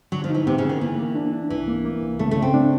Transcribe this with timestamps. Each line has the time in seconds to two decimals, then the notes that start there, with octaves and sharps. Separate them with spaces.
0.12 D3 F#3
0.24 F3
0.29 D#4
0.35 E3
0.46 C3 B3
0.58 C#3
0.65 D3 D#3
0.81 E3 A#3
0.98 A#3
1.15 D4
1.32 D4
1.50 C2 E3
1.68 A#3
1.84 A#3
2.02 C2
2.19 C#3 A3
2.31 A3
2.37 C#3
2.42 C4
2.54 D4